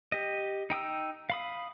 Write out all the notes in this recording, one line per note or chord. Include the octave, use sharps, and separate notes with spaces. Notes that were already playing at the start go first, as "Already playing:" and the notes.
G4 D#5
D#4 G5 D#6 E6
F5 B5 D#6